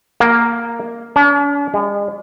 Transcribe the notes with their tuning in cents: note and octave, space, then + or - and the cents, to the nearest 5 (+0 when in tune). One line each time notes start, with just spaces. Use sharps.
A#3 +0
D4 -45
G#3 -40